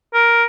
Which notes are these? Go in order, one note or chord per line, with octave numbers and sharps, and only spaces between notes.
A#4